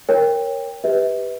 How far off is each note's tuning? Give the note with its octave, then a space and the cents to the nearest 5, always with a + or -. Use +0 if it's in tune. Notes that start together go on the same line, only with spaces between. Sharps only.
A#4 +0 C#5 -15 G5 +20
G4 +10 B4 +0 E5 -35